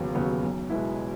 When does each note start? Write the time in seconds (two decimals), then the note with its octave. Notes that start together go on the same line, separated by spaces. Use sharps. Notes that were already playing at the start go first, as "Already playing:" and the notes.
Already playing: E1 D#2 C#3 F#3 B3
0.15 D#2 C#3 F#3 B3
0.43 B1
0.70 B2 G#3 B3 E4